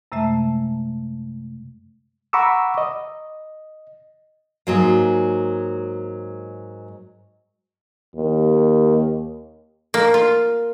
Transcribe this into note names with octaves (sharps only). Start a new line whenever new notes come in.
F#2 C3 G#3 A3 E5 A5
F#5 A#5 B5 C#6 D6 E6
D#5
G#2 F#3 A#3
D#2
A#3
F4